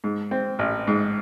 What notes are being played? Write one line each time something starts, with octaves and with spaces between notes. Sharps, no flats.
G#2
C4
A1
G#2